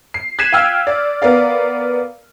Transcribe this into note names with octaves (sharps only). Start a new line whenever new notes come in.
C7
F#6 G#6 B6 C7 D#7 E7
F5 G5 E6 F6 G#6
D5
B3 A#4 D5 F5